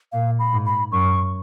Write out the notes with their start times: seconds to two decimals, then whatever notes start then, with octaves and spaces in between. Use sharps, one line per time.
0.12 A#2 F5
0.39 B5
0.52 G#2
0.66 B5
0.92 F#2 C#6